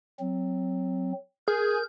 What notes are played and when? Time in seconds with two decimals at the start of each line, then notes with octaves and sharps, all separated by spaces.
0.20 F#3 C4
1.48 G#4 A#4 G6